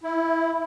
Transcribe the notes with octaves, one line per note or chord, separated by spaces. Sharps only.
E4